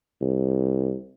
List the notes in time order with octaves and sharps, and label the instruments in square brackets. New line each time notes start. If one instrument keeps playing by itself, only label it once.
[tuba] C2